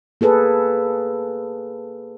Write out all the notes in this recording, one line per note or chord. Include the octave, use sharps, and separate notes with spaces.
A#3 G#4 A4 B4